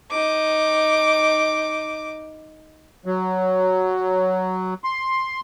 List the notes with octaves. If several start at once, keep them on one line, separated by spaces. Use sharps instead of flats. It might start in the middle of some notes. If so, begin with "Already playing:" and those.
D#4 D6
F#3
C6